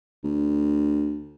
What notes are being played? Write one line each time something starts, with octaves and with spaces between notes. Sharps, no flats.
D2